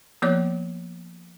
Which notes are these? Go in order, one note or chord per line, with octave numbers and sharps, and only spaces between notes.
F3 A#3 B3 C#5 D5 D6